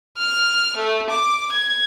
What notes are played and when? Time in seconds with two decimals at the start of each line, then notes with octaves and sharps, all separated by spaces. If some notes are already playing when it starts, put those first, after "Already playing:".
0.18 F6
0.76 A3
1.09 D6
1.52 G#6